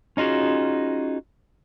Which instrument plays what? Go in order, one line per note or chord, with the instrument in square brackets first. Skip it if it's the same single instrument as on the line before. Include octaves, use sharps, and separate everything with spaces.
[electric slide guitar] C#4 D#4 F4 F#4 G#4